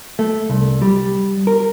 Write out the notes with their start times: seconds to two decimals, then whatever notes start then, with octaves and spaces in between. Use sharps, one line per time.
0.19 A3
0.50 C2
0.82 G3
1.47 A#4